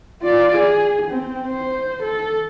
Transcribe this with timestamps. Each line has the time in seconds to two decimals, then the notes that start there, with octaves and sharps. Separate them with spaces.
0.22 F4 D5
0.57 G#4
1.11 C4
1.47 C5
2.03 A4